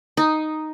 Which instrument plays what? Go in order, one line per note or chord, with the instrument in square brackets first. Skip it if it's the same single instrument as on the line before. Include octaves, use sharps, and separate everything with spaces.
[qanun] D#4